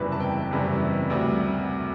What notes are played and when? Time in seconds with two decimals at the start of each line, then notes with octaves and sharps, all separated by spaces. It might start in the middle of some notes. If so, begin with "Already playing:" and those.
Already playing: F#1 E2 C3 E3 G3 B4
0.12 A5
0.20 G5
0.51 F#1 E2 C3 E3 G3
1.10 D2 C3 G3